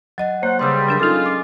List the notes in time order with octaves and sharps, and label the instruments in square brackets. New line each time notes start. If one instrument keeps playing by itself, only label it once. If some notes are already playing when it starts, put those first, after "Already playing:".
[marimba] F#3 D#5 A6 [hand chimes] F#5
[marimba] A#3 [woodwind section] C5 F#5 [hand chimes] C#5
[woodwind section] G2 C#3 G3 [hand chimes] C6 D#6 E6
[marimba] F#3 D4 A#4
[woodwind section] G#3 C#4 F4 [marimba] D#4 A4
[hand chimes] D6